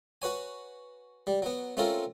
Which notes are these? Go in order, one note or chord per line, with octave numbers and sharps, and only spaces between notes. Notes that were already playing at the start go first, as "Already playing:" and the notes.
F#4 B4 C#5 G#5
G3
F#3 B3
A3 C4 C#4 F4 A4 A#4